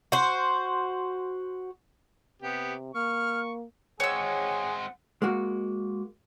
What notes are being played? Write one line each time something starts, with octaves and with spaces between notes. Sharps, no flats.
F#4 C5
C3 B3 G4
A#3 C#6 F6
G#3 C4 G#4 C#5 F#5 E6
G#3 A#3 F#4